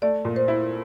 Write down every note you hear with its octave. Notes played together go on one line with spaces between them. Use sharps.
A3 D5
A#2
C5
E4